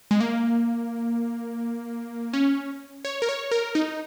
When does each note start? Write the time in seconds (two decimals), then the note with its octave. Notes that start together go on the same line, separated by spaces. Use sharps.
0.11 G#3
0.20 A#3
2.33 C#4
3.05 C#5
3.22 A#4
3.29 C#5
3.51 A#4
3.75 D#4